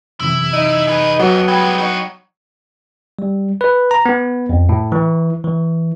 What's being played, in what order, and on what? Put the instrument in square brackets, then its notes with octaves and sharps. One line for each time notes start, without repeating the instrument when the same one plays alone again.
[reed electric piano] F#2 C3 E3 [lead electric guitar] E4
[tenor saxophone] D#4
[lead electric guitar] G#4 B4
[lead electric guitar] F2 [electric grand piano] F#3 [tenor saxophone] B3
[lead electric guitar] G3 G#3 [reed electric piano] G5 B5 G#6
[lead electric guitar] D#4 F#4
[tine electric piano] G3
B4
A#5
B3
F2
A2
E3
E3